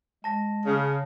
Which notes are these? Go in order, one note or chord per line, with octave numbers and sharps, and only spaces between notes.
G#3 A5 A#6
C#3